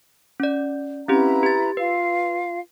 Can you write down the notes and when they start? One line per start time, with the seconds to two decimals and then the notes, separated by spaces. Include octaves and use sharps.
0.40 C#4 D5
1.08 C4 C#4 E4 G4 B4 A#5
1.43 G4 A6
1.77 F4 B4 F5